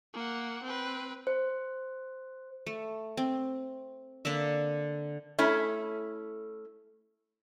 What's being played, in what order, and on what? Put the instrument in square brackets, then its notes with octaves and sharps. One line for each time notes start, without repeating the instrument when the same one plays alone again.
[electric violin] A#3 F#5
C4 B4
[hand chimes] C5
[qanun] A3
C4
D3 A#3 D4 E5
[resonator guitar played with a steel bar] A3 C#4 E4